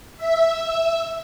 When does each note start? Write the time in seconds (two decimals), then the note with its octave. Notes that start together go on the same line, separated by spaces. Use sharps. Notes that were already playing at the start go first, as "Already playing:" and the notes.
0.17 E5